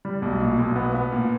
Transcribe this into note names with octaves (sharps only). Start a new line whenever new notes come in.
G3
B1
A#2
B1
B3
B3
A#2